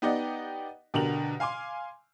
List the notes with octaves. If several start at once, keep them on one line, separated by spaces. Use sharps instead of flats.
B3 D#4 G4 D5 D#5 F#5
B2 D3 G4 A#4 F7 F#7
F5 G#5 C6 D6